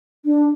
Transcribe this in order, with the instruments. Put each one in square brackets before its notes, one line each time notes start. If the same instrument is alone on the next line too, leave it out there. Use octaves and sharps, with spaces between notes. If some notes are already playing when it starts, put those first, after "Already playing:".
[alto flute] D4